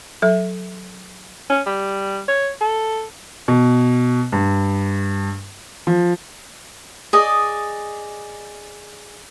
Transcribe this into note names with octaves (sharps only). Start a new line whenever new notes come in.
F#3 A4 E5
C#4
G3
C#5
A4
B2
G2
F3
G#4 D5 D#5